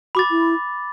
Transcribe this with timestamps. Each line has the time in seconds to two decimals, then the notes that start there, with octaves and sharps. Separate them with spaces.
0.15 F#4 B5 D6 A6
0.31 E4